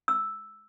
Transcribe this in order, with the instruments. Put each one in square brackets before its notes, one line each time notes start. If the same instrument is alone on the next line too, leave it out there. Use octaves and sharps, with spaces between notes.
[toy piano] E6